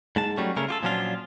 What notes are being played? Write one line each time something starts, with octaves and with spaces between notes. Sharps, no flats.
G#2 G#3 A5
F#3 G3 A3 C#4
C#3 A3 C#4 A#4
F4 G4 A4
A#2 F3 F#3 C#4 D4 F4